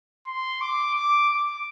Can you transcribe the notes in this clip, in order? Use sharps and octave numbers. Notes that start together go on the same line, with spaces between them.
C6
D6
D6
D6